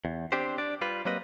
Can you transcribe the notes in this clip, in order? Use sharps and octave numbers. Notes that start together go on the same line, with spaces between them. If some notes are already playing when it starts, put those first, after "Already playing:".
E2
C4 D4 G4 C5
D4 D5
G3 F4 B4
F#3 G3 A#3 C4 B4 D#5